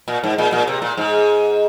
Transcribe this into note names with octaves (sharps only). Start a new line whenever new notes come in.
A#2
G#2
A#2
A#2
C3
A#2
G#2